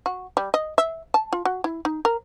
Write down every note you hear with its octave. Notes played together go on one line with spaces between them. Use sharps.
F#4
G3
D#5
E5
A5
F4
F#4
E4
D#4
A#4